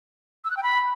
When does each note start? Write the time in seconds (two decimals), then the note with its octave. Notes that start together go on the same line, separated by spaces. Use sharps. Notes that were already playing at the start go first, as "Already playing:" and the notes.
0.45 E6
0.51 F#6
0.57 G5
0.63 B5